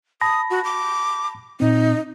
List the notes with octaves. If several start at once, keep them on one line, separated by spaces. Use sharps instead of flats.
A5 B5 D#6 A#6
F#4
D6
A#2 C4 D#4